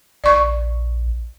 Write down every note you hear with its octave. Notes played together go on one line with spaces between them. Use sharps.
A#1 D5 C#6